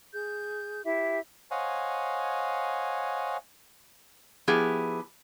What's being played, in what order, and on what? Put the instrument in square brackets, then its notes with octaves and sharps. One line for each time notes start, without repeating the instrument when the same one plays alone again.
[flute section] G#4 G6
E4 G4 E5
[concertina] C5 C#5 D#5 F5 F#5 G#5
[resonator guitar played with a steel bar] F3 B3 E4 G4 G#4